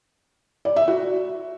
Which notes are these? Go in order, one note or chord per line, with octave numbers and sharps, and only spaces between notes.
D5
E5
F#4